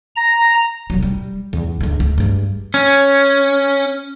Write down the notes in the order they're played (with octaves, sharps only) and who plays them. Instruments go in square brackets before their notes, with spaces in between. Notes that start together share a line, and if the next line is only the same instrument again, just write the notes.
[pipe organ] A#5
[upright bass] E1 F#3
G3
E2
C#2 D3
C#2
G2 G#3
[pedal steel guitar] C#4